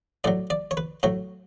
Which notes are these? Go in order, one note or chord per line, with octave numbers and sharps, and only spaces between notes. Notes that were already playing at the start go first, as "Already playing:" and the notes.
A2 F#3 D5
D5
C#5
B4
A2 F#3 C#5